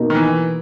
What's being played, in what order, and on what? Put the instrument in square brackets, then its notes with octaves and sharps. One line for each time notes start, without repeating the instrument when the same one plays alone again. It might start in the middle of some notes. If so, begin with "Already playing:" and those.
Already playing: [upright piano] B2 A#3 D#4 A#4
[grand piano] D#3
E3